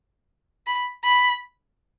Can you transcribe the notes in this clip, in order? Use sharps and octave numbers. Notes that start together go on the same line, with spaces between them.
B5
B5